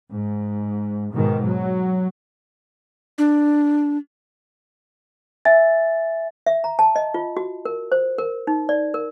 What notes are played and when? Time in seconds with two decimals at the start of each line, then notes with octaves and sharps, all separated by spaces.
0.11 G#2
1.13 G#2 B2 D#3
1.46 F#3
3.18 D4
5.45 E5 G#5 A6
6.46 E5
6.64 A#5
6.79 A5
6.96 D#5
7.14 F4
7.37 F#4
7.65 A#4
7.92 C5
8.18 A#4
8.47 D#4
8.69 D5
8.94 A#4